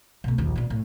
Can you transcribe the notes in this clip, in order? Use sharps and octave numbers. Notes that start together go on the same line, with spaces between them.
B2 A3
A#1 D#2
A#2 D3
A2